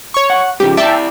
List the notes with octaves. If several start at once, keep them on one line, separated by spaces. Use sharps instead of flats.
C#5 C#6
F#5
G#2 C#3 F3 G4
E4 D5 E5 G5 A5